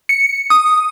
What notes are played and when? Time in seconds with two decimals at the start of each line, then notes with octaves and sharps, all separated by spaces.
0.09 C#7
0.50 D#6